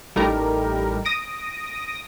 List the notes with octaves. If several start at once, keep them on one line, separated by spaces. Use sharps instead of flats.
A1 G3 A3 D#4 A#4 A#5
D#6 A#6 D7